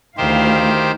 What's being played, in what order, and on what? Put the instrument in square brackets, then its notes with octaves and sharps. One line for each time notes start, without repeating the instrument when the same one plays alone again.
[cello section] D2 E4 F5 [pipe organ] D#3 G4 C5